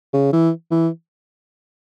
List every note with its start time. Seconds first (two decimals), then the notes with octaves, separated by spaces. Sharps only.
0.13 C#3
0.33 E3
0.71 E3